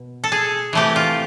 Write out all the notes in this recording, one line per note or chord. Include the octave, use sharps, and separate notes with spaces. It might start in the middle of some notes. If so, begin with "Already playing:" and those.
Already playing: B2
A4
G#4
C3 E3 A3 G4
F4